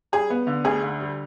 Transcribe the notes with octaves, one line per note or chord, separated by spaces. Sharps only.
G3 G#4
B3
D3
D2 G#4
D3
G3